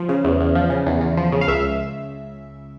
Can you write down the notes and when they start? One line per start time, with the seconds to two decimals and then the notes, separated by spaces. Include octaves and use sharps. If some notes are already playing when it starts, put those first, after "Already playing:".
Already playing: F3
0.09 C#3
0.24 E2
0.40 E2
0.55 F3
0.70 C#3
0.86 E2
1.01 E2
1.17 F3
1.32 C#3
1.41 F5
1.48 C#2 E5